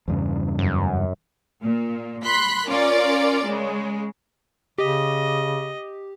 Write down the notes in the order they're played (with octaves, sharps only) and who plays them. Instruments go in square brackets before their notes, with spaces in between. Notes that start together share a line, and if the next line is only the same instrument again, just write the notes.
[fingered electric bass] E2 G2 C#3
[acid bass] F#2
[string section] A#2
B5 C6 F#6 B6
C#4 F4 A#4 D5
C#3 G#3
[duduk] C#3 [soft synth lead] G4 [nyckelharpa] D#5